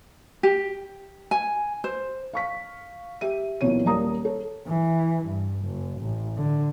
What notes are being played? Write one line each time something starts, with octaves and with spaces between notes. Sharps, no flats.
G4
G#5
C5
F5 C#6 B6
G4 E5 D#7
B1 E2 A#2 E3 C#5 D#7
D#1 A#3 D5 A#5 D#6
A4 C#5
E3
G2
F#1
A1
D3